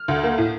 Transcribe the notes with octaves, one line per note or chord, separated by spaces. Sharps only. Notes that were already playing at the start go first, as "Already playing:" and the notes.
Already playing: F6
D2
A#3
A2